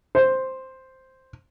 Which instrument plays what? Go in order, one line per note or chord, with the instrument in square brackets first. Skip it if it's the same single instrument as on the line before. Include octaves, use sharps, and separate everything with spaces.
[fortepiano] C5